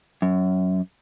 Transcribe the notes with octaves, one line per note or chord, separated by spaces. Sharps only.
F#2